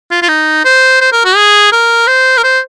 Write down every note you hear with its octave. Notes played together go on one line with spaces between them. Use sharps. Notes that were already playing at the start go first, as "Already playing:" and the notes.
F4
F4
D#4
C5
C5
A#4
F#4
G#4
A#4
C5
A#4
C5